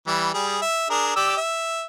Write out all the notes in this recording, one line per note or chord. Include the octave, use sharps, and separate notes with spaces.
E3 G3
G3 G#4
E5
D4 G#4 A#4
G4 D5 E6
E5